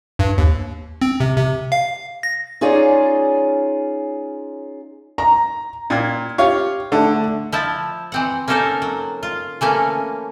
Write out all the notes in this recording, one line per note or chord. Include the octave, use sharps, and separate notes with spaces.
G2
D#2
C4
C3
C3
F5
A#6
C#4 D#4 F4 G#4 C#5 D5
A#5
A#2 G5 G#6
F4 G4 C#5
D3 A3 D4
F3 E4 A5
E3 C4 F#5
A#3 C#4 D#4 A4 A#4 C5
F#3
F4
E3 A3 A#3 C#4